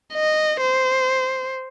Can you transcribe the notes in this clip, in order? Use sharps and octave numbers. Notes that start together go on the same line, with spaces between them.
D#5
C5